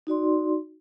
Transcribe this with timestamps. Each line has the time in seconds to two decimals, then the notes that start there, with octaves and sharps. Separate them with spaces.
0.07 D#4 F#4 D5 C6